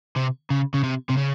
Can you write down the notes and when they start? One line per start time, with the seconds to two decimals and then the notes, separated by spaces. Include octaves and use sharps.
0.17 C3
0.50 C#3
0.74 C#3
0.84 C3
1.10 C3
1.17 C#3